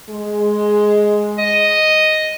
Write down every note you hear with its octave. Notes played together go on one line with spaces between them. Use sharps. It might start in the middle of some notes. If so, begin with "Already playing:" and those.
G#3
D#5